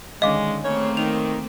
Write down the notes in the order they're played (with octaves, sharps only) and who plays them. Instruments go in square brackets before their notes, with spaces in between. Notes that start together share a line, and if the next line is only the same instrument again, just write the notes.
[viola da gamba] D3 D#3 C#4 [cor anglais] G#3 [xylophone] D#5 F5 D6
[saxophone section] C#3 C#5 [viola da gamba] A3 C4 [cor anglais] A#3
[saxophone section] D#3 [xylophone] F7